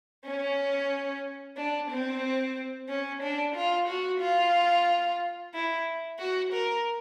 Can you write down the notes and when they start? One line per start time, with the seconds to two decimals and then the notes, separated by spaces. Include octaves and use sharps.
0.25 C#4
1.57 D4
1.90 C4
2.89 C#4
3.22 D4
3.55 F4
3.88 F#4
4.21 F4
5.54 E4
6.19 F#4
6.53 A#4